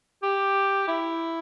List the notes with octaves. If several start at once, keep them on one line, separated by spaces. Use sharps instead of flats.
G4
E4